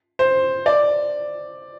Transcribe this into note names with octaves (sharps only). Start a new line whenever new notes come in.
C5
D5